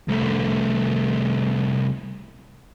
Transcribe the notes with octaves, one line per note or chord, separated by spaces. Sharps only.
C2 A3